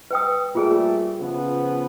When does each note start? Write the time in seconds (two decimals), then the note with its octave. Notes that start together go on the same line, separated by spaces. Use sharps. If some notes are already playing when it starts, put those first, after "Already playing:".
0.11 B4 G5 D#6
0.55 A#2 G3 A3 F4 G#4 G#5
1.21 C#3 F3 B3